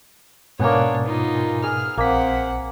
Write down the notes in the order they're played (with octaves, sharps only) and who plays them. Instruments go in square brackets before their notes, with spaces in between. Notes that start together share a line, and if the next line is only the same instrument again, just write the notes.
[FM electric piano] G#2 B2 G#5 [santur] A#3 B3 [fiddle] D4 C#5
[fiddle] D#4 F4
[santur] G#4 [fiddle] F6
[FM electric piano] A#1 B6 [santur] A#3 [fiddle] C4 F#5